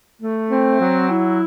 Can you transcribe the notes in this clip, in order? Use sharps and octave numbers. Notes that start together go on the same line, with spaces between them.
A3
C4
F#3
E4